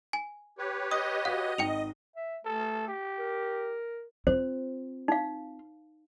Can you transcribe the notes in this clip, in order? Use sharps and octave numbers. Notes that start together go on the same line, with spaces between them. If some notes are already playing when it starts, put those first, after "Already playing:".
G#5
G4 B4 C#5
D#5 D#6
F#4 F5
G#1 D#4 G5 C#7 F7
E5
A3 A4
G4
A#4
C4 F4 C5
D#4 F5